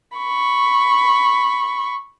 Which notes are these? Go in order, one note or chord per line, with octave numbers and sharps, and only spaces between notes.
B5 C#6